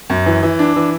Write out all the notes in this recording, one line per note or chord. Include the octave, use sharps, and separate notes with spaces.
F#2
E3
E3
D4
E3